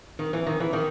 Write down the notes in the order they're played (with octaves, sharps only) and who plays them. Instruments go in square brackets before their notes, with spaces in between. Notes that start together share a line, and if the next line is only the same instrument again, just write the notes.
[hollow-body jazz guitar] D#3
E3
D#3
E3
D#3